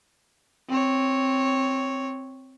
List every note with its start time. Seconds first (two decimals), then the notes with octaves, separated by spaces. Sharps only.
0.69 C4 C#5